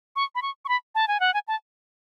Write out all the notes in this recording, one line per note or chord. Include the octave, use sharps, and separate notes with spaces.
C#6
B5
C#6
C#6
B5
A5
G#5
F#5
G#5
A5